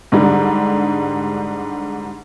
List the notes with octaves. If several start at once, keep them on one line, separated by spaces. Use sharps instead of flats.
G#2 D3 G3